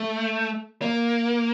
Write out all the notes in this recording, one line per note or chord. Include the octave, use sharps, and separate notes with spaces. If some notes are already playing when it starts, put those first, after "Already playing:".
Already playing: A3
A#3